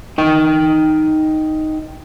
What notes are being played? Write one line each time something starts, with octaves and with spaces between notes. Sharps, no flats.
D#4 G5